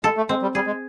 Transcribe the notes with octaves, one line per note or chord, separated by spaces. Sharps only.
G#3 A4
A3
G#3 C4
G3
G3 G#4
G#3